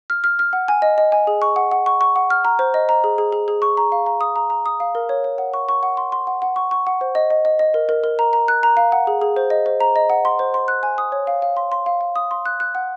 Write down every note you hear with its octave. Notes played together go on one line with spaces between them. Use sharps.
F6
F6
F6
F#5
G#5
D#5
D#5
G#5
G#4
C#6
F#5
F#5
C#6
C#6
F#5
F6
A#5
C5
D#5
A#5
G#4
G#4
G#4
G#4
C#6
A#5
F5
A#5
D#6
A#5
A#5
D#6
F5
A#4
C#5
C#5
F#5
C#6
C#6
F#5
C6
C6
F#5
F#5
C#6
C#6
F#5
C5
D#5
D#5
D#5
D#5
A#4
A#4
A#4
A#5
A#5
F#6
A#5
F5
F#5
G#4
G#4
C5
D#5
C5
A#5
D#5
F#5
C6
C5
C6
F#6
G#5
D#6
C#5
F5
F5
C6
C6
F5
F5
D#6
C6
F#6
F#6
F#5